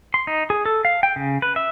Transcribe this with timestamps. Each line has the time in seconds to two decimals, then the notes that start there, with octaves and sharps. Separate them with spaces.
0.14 C6
0.27 D#4
0.50 G#4
0.66 A4
0.85 F5
1.03 G5
1.16 C#3
1.42 B4
1.56 E5